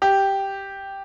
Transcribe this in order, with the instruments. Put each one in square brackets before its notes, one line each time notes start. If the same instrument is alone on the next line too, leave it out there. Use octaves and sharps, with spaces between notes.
[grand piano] G4